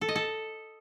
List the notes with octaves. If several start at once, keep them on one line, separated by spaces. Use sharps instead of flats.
A4
D#5
A4